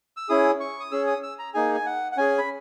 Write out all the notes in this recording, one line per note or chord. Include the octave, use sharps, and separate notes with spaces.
E6
C#4 E4 G#4 D#6
C#6
D#6
C#4 G#4 E6
D#6
E6
A#5
A#3 D#4 G#4 G#5
G#5
F#5
F#5
C#4 G#4 G#5
B5